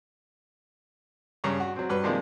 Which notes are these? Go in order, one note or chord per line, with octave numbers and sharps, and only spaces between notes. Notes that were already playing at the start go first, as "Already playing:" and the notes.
G2 C#3 A#5 C#6
F#4
F#3 C4
G2 F#3 B4
C3 D#3 F3 G#3 A#3 D4